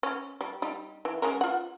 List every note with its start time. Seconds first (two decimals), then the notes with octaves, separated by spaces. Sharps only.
0.03 C#4
0.41 G3
0.62 G3 D#4
1.05 E3
1.22 G#3 C#4 A#4
1.41 F4 F#5